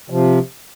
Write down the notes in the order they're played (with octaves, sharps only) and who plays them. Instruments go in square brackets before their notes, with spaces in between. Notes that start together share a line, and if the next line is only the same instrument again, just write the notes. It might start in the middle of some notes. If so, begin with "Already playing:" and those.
[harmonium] C3 F3